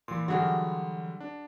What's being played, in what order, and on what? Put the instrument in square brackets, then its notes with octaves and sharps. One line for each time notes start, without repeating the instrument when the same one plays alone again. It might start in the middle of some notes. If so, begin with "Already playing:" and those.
[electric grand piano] A#2 [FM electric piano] E3 C6
[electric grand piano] D3 F#3 G3 [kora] F#4 G#4 A#4
[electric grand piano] D4